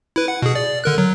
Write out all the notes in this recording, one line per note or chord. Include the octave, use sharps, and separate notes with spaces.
E4 B4
F#5
B2 G#4
D5
D3 A#4 F#6
F#3